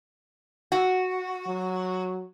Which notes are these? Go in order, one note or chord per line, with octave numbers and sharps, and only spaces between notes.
F#4
F#3